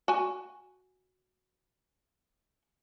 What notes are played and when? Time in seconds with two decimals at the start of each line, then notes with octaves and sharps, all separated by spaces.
0.08 F#4 G#5